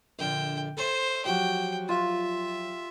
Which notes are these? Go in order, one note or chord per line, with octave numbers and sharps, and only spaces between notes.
A#1 D3 F4 G5
A4 C5 E5 C#6
F3 F#3 F#4 G4 G5
F4 E5